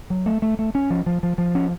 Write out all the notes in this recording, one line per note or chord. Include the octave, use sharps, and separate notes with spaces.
F#3
A3
A3
A3
C#4
F3
F3
F3
F3
C#4